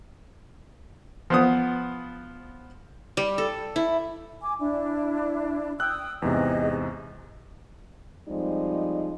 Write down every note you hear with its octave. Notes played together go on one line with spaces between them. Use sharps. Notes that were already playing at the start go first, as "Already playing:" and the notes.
F3 B3 D#6
G3
A4
E4
G#5 D6
D4 E4
G5 D#6 E6 F#6 G6
E2 G#2 C3 G#4 D#5
F3 G3 G#3 C4 D#4